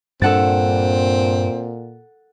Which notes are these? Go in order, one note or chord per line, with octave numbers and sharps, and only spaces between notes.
G2 A#2 C4 D4 A4 F#5 A6